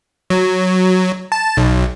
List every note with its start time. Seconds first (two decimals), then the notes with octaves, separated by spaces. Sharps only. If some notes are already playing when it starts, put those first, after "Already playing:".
0.30 F#3
1.32 A5
1.57 B1